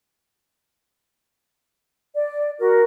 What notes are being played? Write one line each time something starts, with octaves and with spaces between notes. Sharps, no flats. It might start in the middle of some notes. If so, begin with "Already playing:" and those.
D5
F#4 A#4